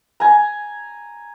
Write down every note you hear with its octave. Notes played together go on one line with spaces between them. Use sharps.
G#5 A#5